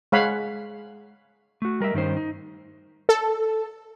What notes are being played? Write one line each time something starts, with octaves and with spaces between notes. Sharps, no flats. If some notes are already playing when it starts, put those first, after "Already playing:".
G#3 C#5 F5 F#5 B5
A3 F#4
G3 A#4 D#5 E5
G2 D#3 C#4 D#4 C5
D#4
A4